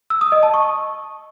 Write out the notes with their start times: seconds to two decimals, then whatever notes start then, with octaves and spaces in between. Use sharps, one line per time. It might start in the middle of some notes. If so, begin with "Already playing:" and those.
0.10 E6
0.21 D#6
0.32 D#5
0.43 A5
0.54 C#6